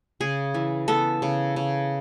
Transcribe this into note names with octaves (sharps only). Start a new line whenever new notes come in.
C#3 G#4
E3
B3 A4
C#3
C#3